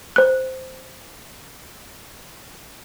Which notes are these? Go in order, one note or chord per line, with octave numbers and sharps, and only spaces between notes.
C5 F#6